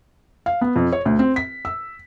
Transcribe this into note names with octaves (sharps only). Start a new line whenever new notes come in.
F5
B3
F2
C#5
D2
C4
B6
E6